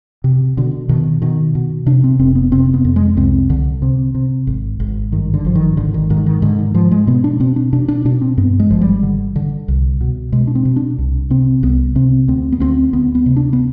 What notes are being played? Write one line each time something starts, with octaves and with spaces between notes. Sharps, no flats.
C3
B2 D3
B2 D#3
B2 D#3
B2
C3 D4
C4
F1 C4
B3
C3 C4
B3
F2
G#3
C2 C4
C2 D3
C3
C3
G#1
G#1
G2 D#3
D3
G#1 F3
D#3
G#1 D3
D#3
G#2 D#3
D#3
G#2 D3
D#3
G#2 F3
G#3
B2 B3
D4
B2 C4
D4
B2 D4
D4
B2 D4
C4
G2 B3
G#3
G#1 F3
G3
D3
D3
C2
B2
B2 G#3
D4
C4
B2
D4
C2
C3 C4
C2 B3
C3 C4
D2 C4
B3
D2 C4
D2 B3
B3
C3
D4
B3